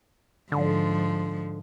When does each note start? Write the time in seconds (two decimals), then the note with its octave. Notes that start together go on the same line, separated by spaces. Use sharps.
0.52 G#2 D3 F3